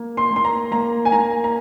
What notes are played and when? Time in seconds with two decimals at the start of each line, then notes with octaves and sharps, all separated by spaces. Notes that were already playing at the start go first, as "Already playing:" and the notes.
Already playing: A#3
0.17 C6
0.31 A#3
0.36 C6
0.45 A#5
0.71 A#3 A#5
1.05 G#5
1.12 A#3 A#5
1.44 A#5